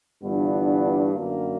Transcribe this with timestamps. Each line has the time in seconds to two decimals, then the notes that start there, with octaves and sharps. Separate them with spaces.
0.22 G1 G2 E3 B3 D4
1.12 F#2 D3 A#3